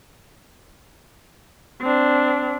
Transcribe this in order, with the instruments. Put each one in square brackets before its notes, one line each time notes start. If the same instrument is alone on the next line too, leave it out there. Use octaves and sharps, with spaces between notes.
[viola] C4 D4